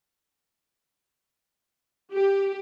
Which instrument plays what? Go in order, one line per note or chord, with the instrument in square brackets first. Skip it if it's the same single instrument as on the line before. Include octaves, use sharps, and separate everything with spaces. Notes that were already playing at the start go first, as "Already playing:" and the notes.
[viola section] G4